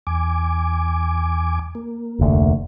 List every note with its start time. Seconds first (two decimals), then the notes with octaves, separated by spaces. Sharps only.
0.07 E2 G#5 D6
1.75 A#3
2.19 F1 D2